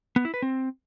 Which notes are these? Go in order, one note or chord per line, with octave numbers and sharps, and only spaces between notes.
B3
E4
B4
C4